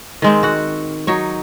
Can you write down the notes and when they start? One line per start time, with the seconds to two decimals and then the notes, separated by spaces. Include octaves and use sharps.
0.22 D#3 G#3 C4
0.43 F#4 F#5
1.07 F#3 D#4 C#5